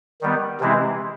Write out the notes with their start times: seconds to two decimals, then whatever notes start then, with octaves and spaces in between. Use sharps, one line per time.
0.21 D#3 G3 B3
0.60 C3 E3 G#3 C4 E4